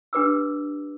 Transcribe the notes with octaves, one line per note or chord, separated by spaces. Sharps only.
D4 G4 B4 D6 E6